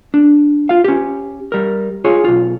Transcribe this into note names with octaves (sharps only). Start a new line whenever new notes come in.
D4
F4 F5
C#4 G4
G3 A#4
F4 G#4 C#5
B1 F4